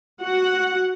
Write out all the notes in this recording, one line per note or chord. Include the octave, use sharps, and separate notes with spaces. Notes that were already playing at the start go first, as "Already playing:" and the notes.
F#4 F#5